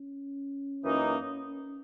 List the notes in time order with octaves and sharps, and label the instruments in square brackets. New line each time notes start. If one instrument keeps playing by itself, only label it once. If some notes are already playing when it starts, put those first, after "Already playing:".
Already playing: [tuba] C#4
[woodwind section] F#2 E3 A#3 D#4